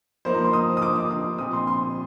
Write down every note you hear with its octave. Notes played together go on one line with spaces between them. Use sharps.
F3 A#3 D#4 C5
A#5
C6
D#6
D#6
D6
D#6
D#6
A#2 F3 C4 D#6
C6
C6